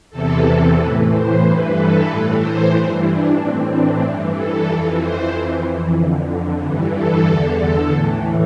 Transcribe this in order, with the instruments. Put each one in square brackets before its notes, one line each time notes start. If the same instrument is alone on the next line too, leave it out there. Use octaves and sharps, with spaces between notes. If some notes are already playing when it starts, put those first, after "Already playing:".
[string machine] E2 C3 E3 A4
A2 E3 B4
C5
G2 E3 B4
A4
A2 E3
C5
G2 E3
D4
A2 E3 C4
D4
G2 E3
A4
F2 E3
C5
F2 E3
F2 D3
G2 E3
A4
E2 D3 A4
A4
A2 E3